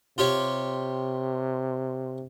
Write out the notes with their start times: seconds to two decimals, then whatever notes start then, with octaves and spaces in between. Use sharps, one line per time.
0.18 C3 F4 G4 C#5